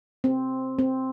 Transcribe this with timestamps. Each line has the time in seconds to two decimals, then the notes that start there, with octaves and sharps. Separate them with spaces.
0.24 C4
0.79 C4